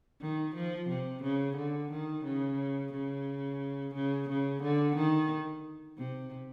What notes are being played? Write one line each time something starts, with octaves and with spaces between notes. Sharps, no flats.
D#3
F3
C3
C#3
D3
D#3
C#3
C#3
C#3
C#3
D3
D#3
C3